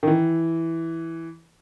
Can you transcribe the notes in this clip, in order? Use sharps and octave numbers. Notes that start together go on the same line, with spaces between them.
D#3
E3